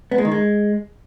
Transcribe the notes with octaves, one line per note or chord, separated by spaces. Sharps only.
B3
G#3
D#3
G#3